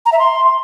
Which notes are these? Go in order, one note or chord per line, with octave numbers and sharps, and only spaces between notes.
A#5
E5
C6